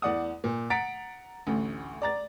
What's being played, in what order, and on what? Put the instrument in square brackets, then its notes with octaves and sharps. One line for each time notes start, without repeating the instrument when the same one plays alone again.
[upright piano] E2 D5 F#5 D#6
A#2
F#5 A#5 A6 B6 D7
A1 D2
D5 A#5 A6